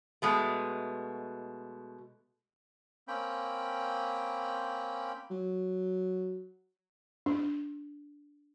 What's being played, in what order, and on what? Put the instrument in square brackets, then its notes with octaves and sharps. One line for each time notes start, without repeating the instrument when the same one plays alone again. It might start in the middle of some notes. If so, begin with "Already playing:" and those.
[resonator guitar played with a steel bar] B2 G#3 A3
[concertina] A#3 C4 C#4 G5 B5
[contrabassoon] F#3
[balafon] D4